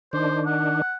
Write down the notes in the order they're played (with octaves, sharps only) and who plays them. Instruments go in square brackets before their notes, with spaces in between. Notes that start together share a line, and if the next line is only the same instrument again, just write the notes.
[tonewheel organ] D#3 D4 [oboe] C5
[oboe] F#5